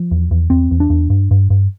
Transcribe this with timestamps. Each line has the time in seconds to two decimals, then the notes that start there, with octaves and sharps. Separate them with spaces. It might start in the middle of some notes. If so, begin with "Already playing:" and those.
Already playing: F3
0.11 E2
0.31 E2
0.50 E2 C4
0.71 E2
0.80 D4
0.90 E2
1.10 G2
1.31 G2
1.50 G2